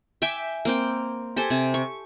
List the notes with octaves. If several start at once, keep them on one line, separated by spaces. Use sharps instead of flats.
E5 G5 G#5 D6
A#3 C4 G5
G4 A4 C5 G#5
C3
C#6